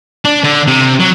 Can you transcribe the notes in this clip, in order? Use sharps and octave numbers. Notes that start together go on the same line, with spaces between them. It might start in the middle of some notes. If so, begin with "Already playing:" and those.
D4
D3
C3
F#3